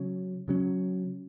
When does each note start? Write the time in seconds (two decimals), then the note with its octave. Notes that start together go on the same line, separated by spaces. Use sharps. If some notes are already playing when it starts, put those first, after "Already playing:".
Already playing: C#3 F#3 C#4
0.48 C#3 F#3 C#4